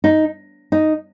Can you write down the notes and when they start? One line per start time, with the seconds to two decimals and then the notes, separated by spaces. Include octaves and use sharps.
0.04 D#4
0.72 D#4